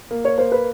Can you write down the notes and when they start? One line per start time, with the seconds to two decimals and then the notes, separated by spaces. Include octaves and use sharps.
0.11 A#3
0.25 C#5
0.38 A#3 C5
0.52 B4